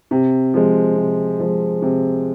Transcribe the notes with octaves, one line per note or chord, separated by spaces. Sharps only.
C3
F3 G#3
C3
F3 G#3
C3